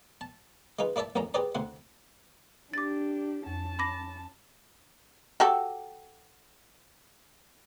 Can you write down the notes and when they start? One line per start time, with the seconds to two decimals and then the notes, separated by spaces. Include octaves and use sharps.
0.21 A5
0.79 G#3 D#4 F4 B4
0.96 A#3 E4 D5 E5 A5
1.15 A1 F2 A#3 C#4 A#5
1.34 G4 G#4 B4 C5 D5 A#5
1.55 D2 C3 F#5 C6
2.73 D4 G4 D6 A6
3.46 F2 C#4 A5
3.79 B5 D6 A#6
5.40 F#4 G4 A4